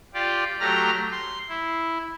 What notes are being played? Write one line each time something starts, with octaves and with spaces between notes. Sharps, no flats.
F4 G4 D5
F#3 A3 G4 A#5 F6
C6
E4